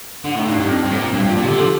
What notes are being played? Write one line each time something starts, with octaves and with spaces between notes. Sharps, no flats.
D3
A2 D#4
G2
D4
G2
F2 C4
G2
A2 C4
A#2
G2 D4
G2
F4
A#2
C3 G4
D3
F3 A4